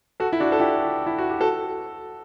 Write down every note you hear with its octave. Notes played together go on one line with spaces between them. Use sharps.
F#4 A4
E4
D4 F#4
A4
E4 G4
E4
F#4
G4
F#4 A4